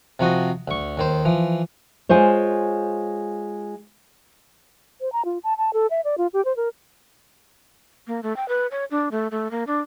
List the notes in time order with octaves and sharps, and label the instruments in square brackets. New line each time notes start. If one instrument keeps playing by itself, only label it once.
[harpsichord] C3 F3 F#4 D#5
D2 C#6
D#2 D#3 C5
E3 F3
[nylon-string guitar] G#3 F4 C5 C#5
[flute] C5
A#5
F4
A5
A5
A4
E5
D5
F4
G4
C5
A#4
[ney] A#3
A3
G5
B4
C#5
D4
A3
A3
A#3
D4